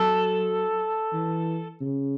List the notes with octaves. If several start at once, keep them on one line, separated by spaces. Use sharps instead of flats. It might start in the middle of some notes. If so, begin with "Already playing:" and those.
Already playing: F#3 A4
E3
C#3